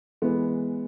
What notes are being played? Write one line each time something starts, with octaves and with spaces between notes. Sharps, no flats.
E3 G#3 B3